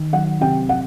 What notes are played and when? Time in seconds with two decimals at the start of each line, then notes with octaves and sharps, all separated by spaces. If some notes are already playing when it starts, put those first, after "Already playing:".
Already playing: D#3
0.13 F#3 F#5
0.41 C3 G5
0.69 F#5